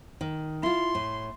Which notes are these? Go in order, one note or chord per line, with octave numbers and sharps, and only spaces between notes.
D#3
E4 F4 C6
A2